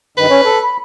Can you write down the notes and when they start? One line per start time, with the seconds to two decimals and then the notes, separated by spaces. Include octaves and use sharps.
0.17 G2 D#3 B4
0.30 C#4 C#5
0.45 A4
0.63 B5